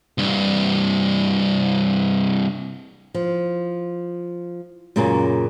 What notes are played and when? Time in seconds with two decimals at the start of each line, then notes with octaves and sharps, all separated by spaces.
0.18 C2 G2
3.14 F3
4.96 F#2 A#2 C#3 A#3 C#4